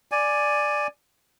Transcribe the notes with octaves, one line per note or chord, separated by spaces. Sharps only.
D5 G#5